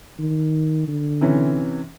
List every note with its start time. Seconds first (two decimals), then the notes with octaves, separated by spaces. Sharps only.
0.19 D#3
0.88 D3
1.21 C3 E3 C#4